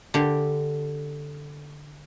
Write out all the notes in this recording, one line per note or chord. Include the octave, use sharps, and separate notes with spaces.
D3 G4